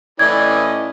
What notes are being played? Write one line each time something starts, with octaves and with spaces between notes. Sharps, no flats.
A2 E3 C#4 D5 D#5 G#6